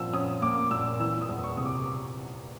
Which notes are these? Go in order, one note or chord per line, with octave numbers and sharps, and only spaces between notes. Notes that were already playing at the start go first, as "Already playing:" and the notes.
Already playing: A#2 F3 E6
C#4 D#6
A#3 D6
A#2 E6
E3 E6
D#6
E2
C#6
C3 D#6
D6